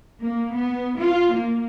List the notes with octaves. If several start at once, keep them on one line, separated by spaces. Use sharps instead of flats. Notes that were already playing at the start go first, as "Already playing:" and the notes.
A#3
B3
F4
A#3